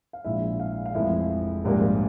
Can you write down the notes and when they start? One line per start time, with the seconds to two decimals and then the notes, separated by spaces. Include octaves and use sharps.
0.13 F5
0.24 A#1 A#2 G#3 E4 E5
0.60 F5
0.86 F5
0.94 F1 F2 E3 G#3 E4 E5
1.65 A#1 G#2 G3 A#3